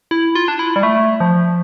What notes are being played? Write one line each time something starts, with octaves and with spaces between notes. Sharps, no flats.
E4
F4
D4
E4
G3
A3
F3